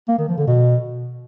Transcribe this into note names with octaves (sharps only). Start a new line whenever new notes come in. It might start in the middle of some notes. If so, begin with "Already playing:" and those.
A#3
D#3
F3
D3
B2